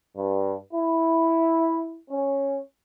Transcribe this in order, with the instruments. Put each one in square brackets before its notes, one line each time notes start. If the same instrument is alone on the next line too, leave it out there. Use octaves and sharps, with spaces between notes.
[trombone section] G2
E4
C#4